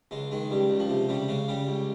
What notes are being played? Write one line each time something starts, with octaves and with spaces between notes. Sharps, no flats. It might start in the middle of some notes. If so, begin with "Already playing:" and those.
C#2 G#3
D#3 G#3
C#2 G3
C#2
F3
C3
C#3 G3
C#3 G#3
C#3 G3
C#2